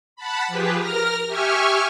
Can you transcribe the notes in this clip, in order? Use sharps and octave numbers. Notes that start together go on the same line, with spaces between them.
F#5 A5 B5
F3 G4 G#4 B4
A#4 F6 A#6
G4 E5 G#5 C#6 F6